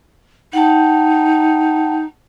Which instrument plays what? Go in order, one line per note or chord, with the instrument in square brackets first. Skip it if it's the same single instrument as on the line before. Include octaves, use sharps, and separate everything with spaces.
[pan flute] D#4 [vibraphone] F#5 G5 A5